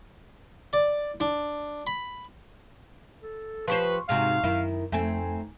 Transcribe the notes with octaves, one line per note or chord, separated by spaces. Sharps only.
D5
D4
B5
A4
F3 G4 B4 C5 C6 C#6
G#2 C3 F#4 F5
F#2 D#3 E4
F2 A3 C4 D#4 G#5